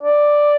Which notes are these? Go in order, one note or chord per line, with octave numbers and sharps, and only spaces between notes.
D5